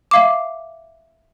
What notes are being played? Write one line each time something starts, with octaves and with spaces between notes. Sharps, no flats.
E5 F5 D6